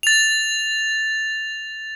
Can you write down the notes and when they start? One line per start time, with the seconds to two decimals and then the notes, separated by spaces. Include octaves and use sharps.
0.03 A6 F7